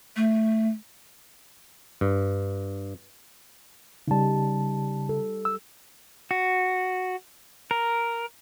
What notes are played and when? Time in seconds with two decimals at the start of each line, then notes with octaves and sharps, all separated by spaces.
0.16 A3
2.01 G2
4.08 C#3 G3 D#4 A5
5.09 A4
5.45 E6
6.31 F#4
7.71 A#4